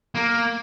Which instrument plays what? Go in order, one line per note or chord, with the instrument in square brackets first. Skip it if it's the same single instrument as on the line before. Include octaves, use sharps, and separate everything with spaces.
[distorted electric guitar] A#3